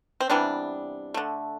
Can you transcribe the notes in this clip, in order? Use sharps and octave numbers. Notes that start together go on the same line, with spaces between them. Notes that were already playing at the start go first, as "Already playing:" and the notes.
C4
C3 E3 G3 B3 D4
D3 A3